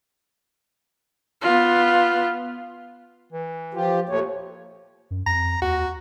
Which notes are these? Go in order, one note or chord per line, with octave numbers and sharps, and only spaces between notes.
B3 F4
E3
F3 F4 G4
D#2 A#2 A3 C#5
F#2
F2 A#5
D#2 F#4